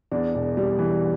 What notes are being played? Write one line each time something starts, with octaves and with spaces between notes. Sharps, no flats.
E2 D4
E1
G3
E3